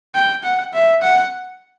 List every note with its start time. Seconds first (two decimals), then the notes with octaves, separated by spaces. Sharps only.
0.14 G5
0.44 F#5
0.74 E5
1.02 F#5